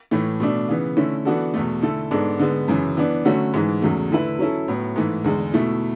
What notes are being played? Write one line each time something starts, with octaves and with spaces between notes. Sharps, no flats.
A2 E3 A3
B2 A3 D4
C#3 E3 B3
D3 A3 C#4 E4
E3 B3 D4 F#4 A4
E2 B2 A3
D3 A3 E4 A4
G#2 G#3 B3 D4 A4
D3 G#3 B3
F#2 C#3 E3
E3 B3 D4
D3 F#3 A3 C#4 F#4
G#2 E3 G#3
E2 C#3 F#3 A3
D3 A3 E4 B4
F#3 C#4 E4 A4
A2 F#3 B3
G#2 E3 A3
E2 D3 G#3
B2 A3 E4